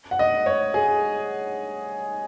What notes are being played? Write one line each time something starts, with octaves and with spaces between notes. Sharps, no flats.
F#5
D#5
C#5
G#4